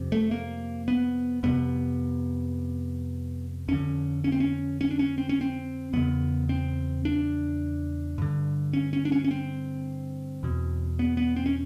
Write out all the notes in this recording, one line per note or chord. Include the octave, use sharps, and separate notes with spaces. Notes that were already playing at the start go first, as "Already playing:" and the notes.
Already playing: F2 C3
A3
A#3
B3
F2 C3 B3
F2 D3 C#4
C#4
C4
C#4
C#4
D4
C#4
C4
C#4
C4
E2 C#3 B3
C4
D4
G2 D3
C#4
C#4
D4
C#4
C#4
C4
E2 B2
B3
B3
C4
C#4